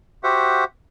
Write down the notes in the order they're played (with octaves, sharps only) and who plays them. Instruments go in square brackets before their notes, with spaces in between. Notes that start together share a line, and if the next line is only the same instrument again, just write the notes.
[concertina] F#4 G4 C5 E5 F#5